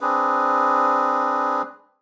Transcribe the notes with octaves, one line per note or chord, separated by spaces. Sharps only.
C4 D4 G#4 B4